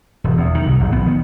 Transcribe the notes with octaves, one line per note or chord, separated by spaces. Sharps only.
E1
E2
D#3
C2
A#1
B3
D#3